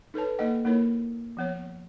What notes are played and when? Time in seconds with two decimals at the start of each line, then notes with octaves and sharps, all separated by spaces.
0.14 D#4 A4 B4 C#5 A5
0.38 A#3 D#4 A4 D#5 F#5 G5
0.65 A#3 D#4 E4 A#4 C#5
1.37 F3 B3 C#5